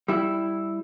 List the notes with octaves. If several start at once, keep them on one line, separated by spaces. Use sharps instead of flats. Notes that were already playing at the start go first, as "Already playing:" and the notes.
G3 E4